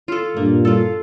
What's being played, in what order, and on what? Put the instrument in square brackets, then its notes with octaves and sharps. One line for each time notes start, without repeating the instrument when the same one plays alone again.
[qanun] F4 A4
[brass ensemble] G2 A#2 [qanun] A#3
[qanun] F4 A4